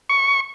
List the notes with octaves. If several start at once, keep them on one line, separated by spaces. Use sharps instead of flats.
C#6